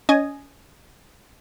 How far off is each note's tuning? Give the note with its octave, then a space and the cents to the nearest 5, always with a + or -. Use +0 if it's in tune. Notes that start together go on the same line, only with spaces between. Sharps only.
C#4 +25 D#5 -10 G#5 +10